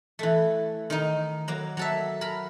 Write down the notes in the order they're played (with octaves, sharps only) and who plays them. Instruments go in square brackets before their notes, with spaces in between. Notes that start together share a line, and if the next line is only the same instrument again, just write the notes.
[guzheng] E3 A3
D#3 D#4
F#3 A#3
F#3 A4 E5
A#4 B5